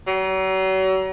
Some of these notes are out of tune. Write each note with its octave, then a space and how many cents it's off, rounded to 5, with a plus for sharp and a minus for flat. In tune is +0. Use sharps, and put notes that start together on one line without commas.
F#3 +40